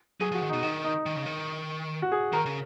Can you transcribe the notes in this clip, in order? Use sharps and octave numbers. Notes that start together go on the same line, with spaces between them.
F#3 G#4
F3 F#4
D#3
D#4
B2
D#3 D#4
D#4
D#3
C#3
D#3
F#4
G#4
D#3 A#4
C#3